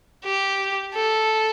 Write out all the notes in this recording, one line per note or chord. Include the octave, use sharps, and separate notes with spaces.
G4
A4